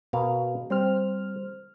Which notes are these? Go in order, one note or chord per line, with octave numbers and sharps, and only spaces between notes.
B2 A#4 F5
G3 C4 C5 F6